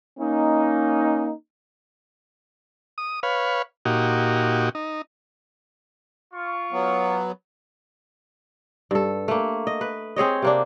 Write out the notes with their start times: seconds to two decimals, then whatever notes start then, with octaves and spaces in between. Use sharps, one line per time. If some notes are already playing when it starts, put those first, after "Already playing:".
0.19 A#3 C#4 D#4
2.98 D#6
3.23 B4 C#5 F5
3.85 A#2 D#4 F#4 G4
4.75 D#4
6.33 F4 C#6
6.72 F#3 B3
8.91 G2 A4
9.28 A3 A#3
9.67 D#5
9.81 B4
10.16 C4 G#4 C#5 D#5
10.42 C3 A#3 D4